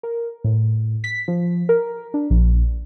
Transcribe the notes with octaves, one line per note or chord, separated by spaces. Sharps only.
A#4
A2
B6
F3
A#4
D4
A#1